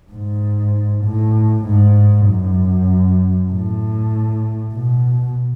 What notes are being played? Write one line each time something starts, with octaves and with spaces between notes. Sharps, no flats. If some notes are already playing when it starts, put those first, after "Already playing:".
G#2
A2
G#2
F#2
A2
B2